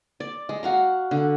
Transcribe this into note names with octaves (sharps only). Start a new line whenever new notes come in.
D5
G#3
F#4 F5 A#5
D3